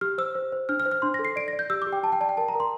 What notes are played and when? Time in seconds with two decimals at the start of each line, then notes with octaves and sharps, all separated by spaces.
0.01 G4 F6
0.18 C5 E6
0.35 C5
0.52 C5
0.69 D4 F6
0.80 F6
0.86 C5
0.91 F6
1.02 D4 C6
1.14 A#6
1.19 A4
1.25 C7
1.36 D5 D7
1.48 A#6
1.53 D5
1.59 G6
1.70 G4 E6
1.82 D6
1.87 G4
1.93 G5
2.03 G4 A5
2.12 G5
2.21 D5 A5
2.29 G5
2.37 A#4 A5
2.48 A#5
2.55 A#4 C6